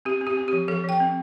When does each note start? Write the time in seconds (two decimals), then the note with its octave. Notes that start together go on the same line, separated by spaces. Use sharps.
0.05 C4 G4
0.21 C4
0.27 G4
0.37 C4
0.48 F3 G4
0.68 F3 A4
0.84 F3 G5
1.00 C4